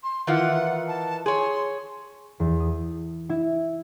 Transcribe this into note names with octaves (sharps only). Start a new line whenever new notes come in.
C6
D#3 E3 F4 F#5
A5
G#4 C#5 C6
E2
D#6
E4